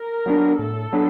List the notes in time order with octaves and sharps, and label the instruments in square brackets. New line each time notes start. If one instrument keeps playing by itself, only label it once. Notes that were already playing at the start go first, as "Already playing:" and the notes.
Already playing: [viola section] A#4
[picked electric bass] F#3 B3 D4
[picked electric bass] A2 [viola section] A4
[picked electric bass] F#3 B3 D4